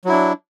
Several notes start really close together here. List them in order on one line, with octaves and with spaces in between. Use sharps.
F#3 E4 D4